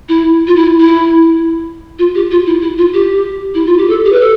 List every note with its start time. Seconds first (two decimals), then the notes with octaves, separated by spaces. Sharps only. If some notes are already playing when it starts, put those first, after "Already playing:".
0.09 E4
0.47 F4
0.56 E4
0.80 E4
1.99 F4
2.15 G4
2.31 F4
2.47 E4
2.62 E4
2.78 F4
2.94 G4
3.55 E4
3.67 F4
3.78 G4
3.89 A4
4.05 G4
4.12 B4
4.20 A4